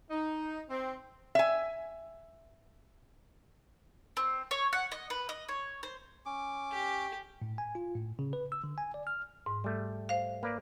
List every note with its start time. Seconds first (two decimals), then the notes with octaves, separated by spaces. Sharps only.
0.11 D#4
0.69 C4
1.35 E5 G#5
4.17 C4
4.51 C#5
4.73 F#5
4.92 D#5
5.10 B4
5.29 D#5
5.48 C#5
5.83 C5
6.26 C#4 D6
6.71 G4
7.42 A2
7.58 G#5
7.75 F4
7.96 A2
8.19 C#3
8.33 B4
8.52 E6
8.64 D3
8.78 G#5
8.94 D5
9.07 F6
9.46 G#2
9.64 G3 A3
10.09 C5 F5
10.43 A#3 B4 D5